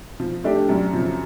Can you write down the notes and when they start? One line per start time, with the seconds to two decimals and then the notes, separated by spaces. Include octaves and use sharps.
0.20 F3
0.44 A3 D4 G4
0.69 F#2
0.93 C#3 F3